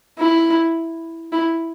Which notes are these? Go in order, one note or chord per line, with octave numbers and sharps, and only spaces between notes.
E4
E4